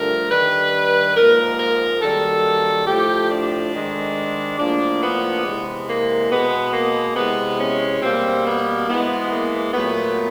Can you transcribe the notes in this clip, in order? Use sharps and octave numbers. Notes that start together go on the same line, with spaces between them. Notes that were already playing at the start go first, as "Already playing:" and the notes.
Already playing: G2 D3 F3 A3 A#4
G2 D#3 G3 B4
G#2 F3 A#3 A#4
A#4
F#2 D#3 G3 A#3 A4
A2 F3 A3 G4
D4
G#2 D#3 G#3
A2 F3 A#3 D4
B3
C3 E3 G#3
A#3
B2 G#3 B3
A#3
C3 E3 G#3 B3
C#4
B2 G3 A#3 C4
B3
G#2 E3 G#3 B3
A#3
A#2 F#3 A3 B3